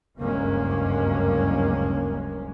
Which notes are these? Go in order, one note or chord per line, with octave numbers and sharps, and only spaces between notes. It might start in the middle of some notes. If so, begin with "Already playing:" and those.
F#1 D2 G2 G#3 A#3 C#4